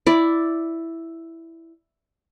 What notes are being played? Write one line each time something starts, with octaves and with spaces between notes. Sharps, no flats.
E4 D5